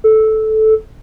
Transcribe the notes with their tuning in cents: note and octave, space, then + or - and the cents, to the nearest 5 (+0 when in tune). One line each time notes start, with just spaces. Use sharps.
A4 -10